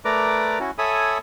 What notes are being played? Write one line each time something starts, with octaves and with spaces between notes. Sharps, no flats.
A3 A#4 B4 D5 A#5 D6
C#4 E4 F#4
A4 C#5 E5 G#5 B5 D#6